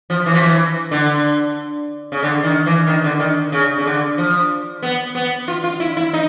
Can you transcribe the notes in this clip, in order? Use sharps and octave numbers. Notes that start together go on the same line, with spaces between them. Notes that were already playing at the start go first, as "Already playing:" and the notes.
F3
E3
F3
E3
D3
C#3
D3
D#3
E3
D#3
D3
D#3
C#3
C#3
D3
F3
B3
B3
F4
F4
E4
E4
D#4